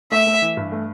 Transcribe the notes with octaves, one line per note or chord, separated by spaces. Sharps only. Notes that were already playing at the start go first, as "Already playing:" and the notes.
A3 E5
A3
E3
G2
A3